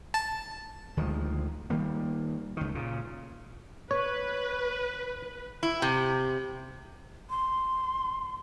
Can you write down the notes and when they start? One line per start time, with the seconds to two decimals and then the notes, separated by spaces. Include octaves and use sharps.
0.14 A5
0.97 D2 D#3 F3 G#3
1.70 D#3 G3 A#3
2.57 C#2 D#3
2.75 A#2 C#3
3.91 B4 C#5
5.63 E4
5.82 C3
7.30 C6